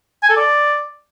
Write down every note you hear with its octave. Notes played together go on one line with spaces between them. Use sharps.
G#5
A4
D5